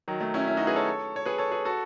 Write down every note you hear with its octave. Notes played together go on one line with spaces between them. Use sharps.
D#3 F#3
F#3 A3
C#4 E4
C#4 E4
D#4 F#4
G#4 B4
A4 C#5
C#5
G#4 B4
A4 C#5
G#4 B4
F#4 A4